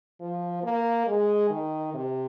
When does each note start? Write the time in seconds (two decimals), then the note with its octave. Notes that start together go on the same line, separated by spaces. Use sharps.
0.21 F3
0.63 A#3
1.07 G#3
1.50 D#3
1.94 C3